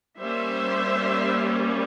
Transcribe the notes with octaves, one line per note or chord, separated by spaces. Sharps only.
G3 A#3 C#4 C5 E5